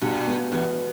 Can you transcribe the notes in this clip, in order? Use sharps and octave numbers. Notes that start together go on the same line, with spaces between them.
G2 B2
B3
E2 B3